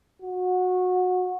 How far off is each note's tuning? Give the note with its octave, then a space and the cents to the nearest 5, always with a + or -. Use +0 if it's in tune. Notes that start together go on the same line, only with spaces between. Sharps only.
F#4 -20